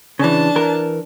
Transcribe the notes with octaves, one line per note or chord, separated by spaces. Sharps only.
C#3 E3 D4 A5
E3 A#4